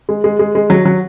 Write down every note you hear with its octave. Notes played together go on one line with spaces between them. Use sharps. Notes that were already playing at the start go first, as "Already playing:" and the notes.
G#3
G#3
G#3
G#3
F#3
F#3